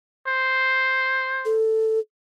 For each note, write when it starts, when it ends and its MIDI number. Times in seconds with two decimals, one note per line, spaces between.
0.27 1.57 72
1.45 1.99 69